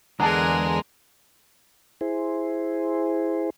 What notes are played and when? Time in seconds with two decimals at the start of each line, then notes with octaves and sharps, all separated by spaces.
0.20 E2 D3 G#3 G#4 A#4 F#5 A5 A#5
2.01 E4 G#4 C5